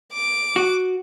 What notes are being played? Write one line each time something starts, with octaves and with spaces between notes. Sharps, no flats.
D6
F#4